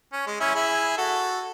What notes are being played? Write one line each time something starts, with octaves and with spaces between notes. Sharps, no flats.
C#4
G#3
C#4 E4
E4 G#4
F#4 A4